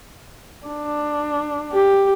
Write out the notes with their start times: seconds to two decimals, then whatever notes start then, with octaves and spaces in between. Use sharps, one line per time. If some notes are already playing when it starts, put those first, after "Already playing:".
0.67 D4
1.73 G4